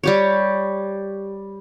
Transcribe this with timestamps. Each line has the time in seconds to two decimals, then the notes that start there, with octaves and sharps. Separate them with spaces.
0.03 G3 G4 C#5